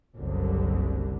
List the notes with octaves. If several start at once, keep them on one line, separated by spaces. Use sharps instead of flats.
F#1 C2 D3